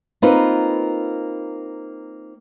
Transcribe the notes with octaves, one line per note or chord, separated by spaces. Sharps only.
A#3 C4 D#4 F4 B4